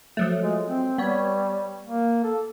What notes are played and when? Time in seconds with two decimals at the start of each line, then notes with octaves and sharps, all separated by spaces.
0.17 F3 F#3 A3
0.42 G#3
0.66 C4
0.98 G3 B3 C#5
1.84 A#3
2.24 A4